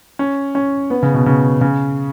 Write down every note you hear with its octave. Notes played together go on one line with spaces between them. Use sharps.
C#4
C#4
B3
C#3
B2
C#3
C#3